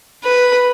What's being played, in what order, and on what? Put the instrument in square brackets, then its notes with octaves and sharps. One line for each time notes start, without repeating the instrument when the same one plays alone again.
[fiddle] B4